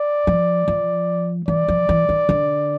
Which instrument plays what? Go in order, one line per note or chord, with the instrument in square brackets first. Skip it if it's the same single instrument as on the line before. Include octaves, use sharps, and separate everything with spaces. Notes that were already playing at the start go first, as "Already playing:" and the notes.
Already playing: [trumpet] D5
[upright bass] F3
F3
[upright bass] E3 [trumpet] D5
[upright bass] F3
E3
D#3
D3